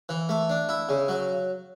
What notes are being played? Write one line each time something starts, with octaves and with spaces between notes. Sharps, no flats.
E3
A3
D4
E4
C#3
F#3